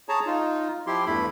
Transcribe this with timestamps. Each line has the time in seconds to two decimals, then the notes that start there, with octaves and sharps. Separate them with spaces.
0.09 G#4 C#5 A5 A#5
0.26 D#4 F4
0.87 F3 E4 G4 C6
1.06 E2 G2 A3 E4 B5